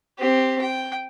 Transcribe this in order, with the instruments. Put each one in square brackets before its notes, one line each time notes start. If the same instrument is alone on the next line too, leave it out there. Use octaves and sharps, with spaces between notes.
[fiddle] C4 G4
G5